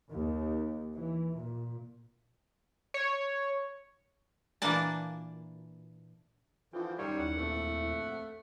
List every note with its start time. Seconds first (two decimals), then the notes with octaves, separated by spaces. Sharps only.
0.10 D#2
0.96 E3
1.35 A#2
2.94 C#5
4.62 A#2 E3 A#3 D4 D5 A5
6.73 D3 E3 F3 F4 G5
6.98 F#2 D#3 F#3 G3 C#5 G5 C6 C#6
7.19 D#2 E4 F#5
7.37 A#1 F2 A3